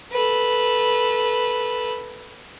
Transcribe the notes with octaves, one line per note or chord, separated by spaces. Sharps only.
A4 B4